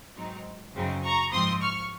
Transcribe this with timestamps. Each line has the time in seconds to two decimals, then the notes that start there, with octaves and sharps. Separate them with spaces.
0.16 G#2 F#3 C4 D#4
0.74 F#2 C#3 F#3 C4 D#4
1.03 A#5 C#6
1.32 G#2 F3 C4 C6 D#6
1.61 C#6 F6